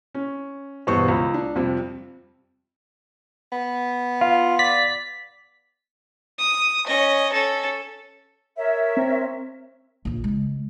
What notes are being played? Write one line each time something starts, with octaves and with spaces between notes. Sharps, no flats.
C#4
E1 G2 B3 C5 C#6
C#2
D4
F2 C3 G3
B3
F4 F5
D5 B6
D#6
C#4 D#5
C#4 A4
A#4 C#5 E5
C4
A#1 F2
C#3 G#3